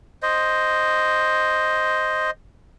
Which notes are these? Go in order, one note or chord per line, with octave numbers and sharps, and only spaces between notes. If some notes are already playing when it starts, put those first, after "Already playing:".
C5 D#5